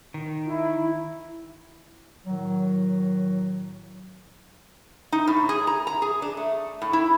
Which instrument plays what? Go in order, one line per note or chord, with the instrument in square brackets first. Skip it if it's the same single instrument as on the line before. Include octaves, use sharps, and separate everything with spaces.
[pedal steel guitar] D#3
[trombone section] E4
[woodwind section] A2 D#3 F#3
[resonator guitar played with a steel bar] D#4
A2
G#4
A#5
A#5
G#4
D4
A3
A2
E4